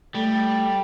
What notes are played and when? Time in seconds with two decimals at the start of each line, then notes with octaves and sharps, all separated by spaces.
0.15 G3 A3